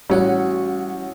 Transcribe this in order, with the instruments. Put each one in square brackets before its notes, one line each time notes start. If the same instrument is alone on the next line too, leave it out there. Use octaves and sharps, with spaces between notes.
[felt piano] A1 C#5 [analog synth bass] G3 [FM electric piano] C#4 F#4 F#5